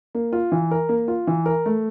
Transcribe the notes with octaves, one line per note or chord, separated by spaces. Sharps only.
A#3
F4
E3
A#4
A#3
F4
E3
A#4
A3